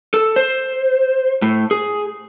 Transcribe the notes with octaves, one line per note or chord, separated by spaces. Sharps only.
A4
C5
A2
G#4